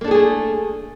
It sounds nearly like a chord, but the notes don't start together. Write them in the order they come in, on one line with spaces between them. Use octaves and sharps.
A#3 D4 A4 G#4 A3